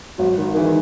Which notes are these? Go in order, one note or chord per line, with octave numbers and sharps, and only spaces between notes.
G#1 F#3
D#3
D#3 E3 G#3